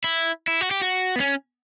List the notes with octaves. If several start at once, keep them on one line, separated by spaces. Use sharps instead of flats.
E4
E4
F#4
G4
F#4
B3
C#4